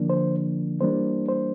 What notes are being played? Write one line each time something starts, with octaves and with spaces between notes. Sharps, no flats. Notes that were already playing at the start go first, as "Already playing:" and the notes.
Already playing: D3 F3 A#3 D4
C5
E3 G3 A#3 D4 C5
C5